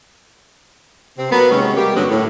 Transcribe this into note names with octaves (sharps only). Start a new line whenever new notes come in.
C3 C4
F#3 A#3 B3
C3 D#3 F#3 G#3 C#4
G3 A#3 G4
G2 D3 F#3 B3 C#4 F#4
A2